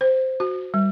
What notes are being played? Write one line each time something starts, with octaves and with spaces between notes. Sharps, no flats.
C5
F#4
G3